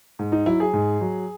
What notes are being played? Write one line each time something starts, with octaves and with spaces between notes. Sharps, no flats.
G#2
D#4
F#3 E4
G#4
G#2
F#3